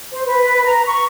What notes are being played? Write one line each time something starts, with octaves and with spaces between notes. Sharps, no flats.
C5
B4
A#5
C#6